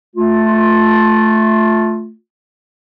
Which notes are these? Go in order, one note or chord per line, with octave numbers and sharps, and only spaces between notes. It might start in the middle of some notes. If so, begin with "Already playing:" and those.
A3 F4